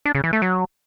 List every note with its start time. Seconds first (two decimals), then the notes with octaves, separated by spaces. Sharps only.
0.05 D4
0.15 C#3
0.24 E3
0.33 A3
0.42 F#3